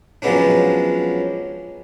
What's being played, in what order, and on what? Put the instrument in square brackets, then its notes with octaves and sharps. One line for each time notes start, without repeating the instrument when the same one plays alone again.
[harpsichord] F3 F#3 G#3 B3 C#4 D4